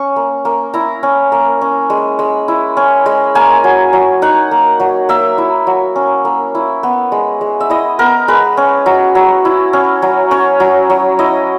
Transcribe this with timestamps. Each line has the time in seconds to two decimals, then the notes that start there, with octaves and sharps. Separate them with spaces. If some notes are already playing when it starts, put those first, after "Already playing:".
Already playing: C#4 C#6
0.16 A#3
0.45 A#3
0.74 E4 A#5
1.03 C#4
1.32 A#3
1.61 C#4
1.90 G#3
2.19 G#3
2.48 E4
2.77 C#4
3.06 G#3
3.35 A#3 G#5
3.64 F#3
3.93 F#3
4.22 D#4 F#5
4.51 A#3
4.80 F#3
5.09 A#3 E5
5.38 E4
5.67 F#3
5.96 C#4
6.25 A#3
6.55 E4
6.83 B3
7.12 G#3
7.41 G#3
7.60 E5
7.70 E4 D#5
7.99 B3 A#4
8.28 G#3 B4
8.57 C#4
8.86 F#3
9.15 F#3
9.45 E4
9.73 C#4
10.02 F#3
10.31 C#4 C#5
10.60 F#3
10.90 F#3
11.19 E4 D#5